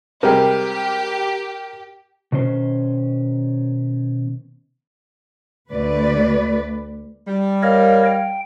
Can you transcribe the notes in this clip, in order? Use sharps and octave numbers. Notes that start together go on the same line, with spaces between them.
C3 G3 G#3 G4 A#4 G5
B2 D#3 C#4 C5
D2 B4 D5
G3
A#4 C#5 D#5 F5
G5